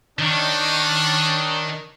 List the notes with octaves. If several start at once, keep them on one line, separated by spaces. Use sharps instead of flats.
D#3 C#4 D4